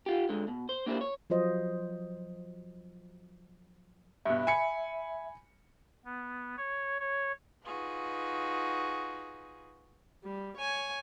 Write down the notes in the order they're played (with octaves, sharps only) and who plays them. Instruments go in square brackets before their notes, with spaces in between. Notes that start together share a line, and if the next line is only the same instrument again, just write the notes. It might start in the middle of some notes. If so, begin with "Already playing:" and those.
[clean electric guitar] F4 G4
D3 G#3
B2
C5
A#3 D4 E4 G4 B4 C5
C#5
[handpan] F3 F#3 F4 C5 D#5
[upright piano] G2 B2 [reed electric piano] E5
[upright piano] G#5 B5 C#7
[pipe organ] B3
C#5
C#5
[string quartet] D#4 F4 F#4 G#4 B4
[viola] G3
C#5 G#5